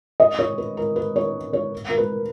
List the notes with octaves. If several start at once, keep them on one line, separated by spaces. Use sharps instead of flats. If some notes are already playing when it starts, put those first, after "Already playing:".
D#5
C#5
B4
A#4
B4
C#5
C#5
A#4
B4